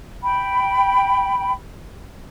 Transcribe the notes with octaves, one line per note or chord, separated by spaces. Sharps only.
G5 B5